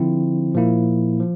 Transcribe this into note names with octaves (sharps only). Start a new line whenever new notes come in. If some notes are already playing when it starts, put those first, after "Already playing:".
Already playing: D3 F3 C4 E4
A#2 F3 A#3 E4
F3